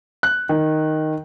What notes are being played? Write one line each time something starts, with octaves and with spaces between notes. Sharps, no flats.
F#6
D#3